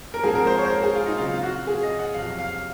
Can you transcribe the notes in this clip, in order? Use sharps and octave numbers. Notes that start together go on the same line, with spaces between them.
A#4
G#2 F3 C4 G#4
A#4
C5
C#5
C5
A#4
G#4
F4
D#4
C#3 F#3 C4 F4
F4
F#4
G#4
D#5
F#5
F2 C3 F#3 F5
F5